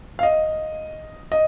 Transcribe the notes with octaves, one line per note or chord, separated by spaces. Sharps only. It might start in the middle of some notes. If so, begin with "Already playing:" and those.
F5
D#5
D#5